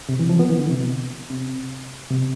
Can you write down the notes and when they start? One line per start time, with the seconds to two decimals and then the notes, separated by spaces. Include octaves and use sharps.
0.09 C3
0.19 E3
0.29 F3
0.39 B3
0.49 E3
0.59 D3
0.69 C3
0.79 B2
1.30 C3
2.10 C3